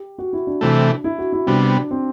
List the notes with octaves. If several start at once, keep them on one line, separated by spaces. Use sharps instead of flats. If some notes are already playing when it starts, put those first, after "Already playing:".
Already playing: G4
F#4
E4
D4
C3 E3 A3
E4
F#4
E4
C3 G3 B3 D4
C4